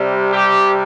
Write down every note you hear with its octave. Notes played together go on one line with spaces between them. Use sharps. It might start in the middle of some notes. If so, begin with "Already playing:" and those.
Already playing: C3 G3
G4